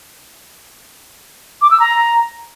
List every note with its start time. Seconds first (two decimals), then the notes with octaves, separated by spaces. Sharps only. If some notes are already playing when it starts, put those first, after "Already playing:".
1.62 D6
1.71 E6
1.80 A#5